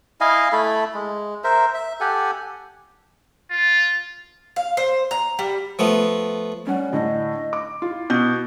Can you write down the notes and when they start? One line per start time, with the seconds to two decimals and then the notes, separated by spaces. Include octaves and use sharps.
0.21 E4 D#5 F5 G#5
0.52 A3 E4 A4 B5
0.94 G#3
1.44 A#4 C5 E5
1.74 E5
2.01 G4 A4 F#5 G#5
3.50 F4
4.56 F5
4.77 C5
5.11 A#5
5.39 G3
5.79 F3 A3 B3
6.67 G3 C#4 F#5
6.93 A2 D3 D#5
7.53 D6
7.82 E4 F4
8.10 B2 G6